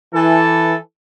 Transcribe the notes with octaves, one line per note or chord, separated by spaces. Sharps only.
E3 A4